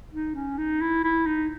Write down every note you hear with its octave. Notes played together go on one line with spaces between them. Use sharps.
D#4
C#4
D#4
E4
E4
D#4